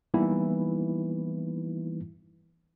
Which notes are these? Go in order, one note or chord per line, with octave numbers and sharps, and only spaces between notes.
E3 G3 A#3 B3 D#4 E4